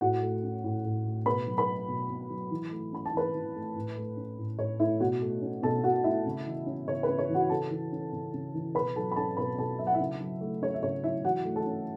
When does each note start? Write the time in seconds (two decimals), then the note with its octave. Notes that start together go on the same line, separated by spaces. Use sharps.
0.01 A2 F#4 F#5
0.22 A3
0.43 C#4
0.64 A2
0.85 A2
1.06 A3
1.26 B2 B4 B5
1.47 F#3
1.58 B4 B5
1.67 A3
1.88 B2
2.10 B2
2.30 F#3
2.51 E3
2.71 A3
2.92 C#4 B5
3.06 A5
3.13 E3 B4 B5
3.34 E3
3.55 A3
3.76 A2
3.96 A3
4.17 C#4
4.38 A2
4.58 A2 C#5
4.79 A3 E4 E5
5.00 B2 F#4 F#5
5.22 A3
5.42 C#4
5.63 B2 A4 A5
5.84 B2 F#4 F#5
6.04 A3 E4 E5
6.26 C#3
6.46 E3
6.66 C#4
6.88 C#3 C#5
7.03 B4
7.09 C#3
7.19 C#5
7.29 E3
7.34 F#4 F#5
7.50 C#3 A4 A5
7.71 E3
7.92 C#4
8.13 C#3
8.34 C#3
8.54 E3
8.75 B2 B4 B5
8.96 F#3 A4 A5
9.11 B5
9.16 C#4 A4 A5
9.37 B2 B4 B5
9.58 B2 A4 A5
9.79 F#3 E5
9.87 F#5
9.94 E4 E5
10.00 C#3
10.20 F#3
10.41 A3
10.62 C#4 C#5
10.74 E5
10.83 C#3 C#5
11.04 F#3 E4 E5
11.24 E3 F#4 F#5
11.45 A3
11.56 A4 A5
11.66 C#4